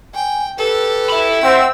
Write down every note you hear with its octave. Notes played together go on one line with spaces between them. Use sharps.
G5 G#5
G4 A4 B4
E5 B5
C4 F#5 E6